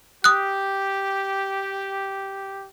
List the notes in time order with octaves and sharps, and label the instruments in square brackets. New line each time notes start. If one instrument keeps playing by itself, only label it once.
[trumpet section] G4 [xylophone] D#6 F#6